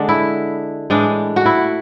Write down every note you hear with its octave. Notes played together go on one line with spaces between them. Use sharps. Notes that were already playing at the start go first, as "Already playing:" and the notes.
Already playing: D3 G#3 D4
E4
A2 E3 G#3 D4
F#4
E4